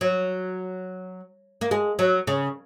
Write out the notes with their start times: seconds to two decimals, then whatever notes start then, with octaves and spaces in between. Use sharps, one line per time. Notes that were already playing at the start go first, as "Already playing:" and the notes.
0.01 F#3
1.61 A#3
1.71 G#3
1.99 F#3
2.27 C#3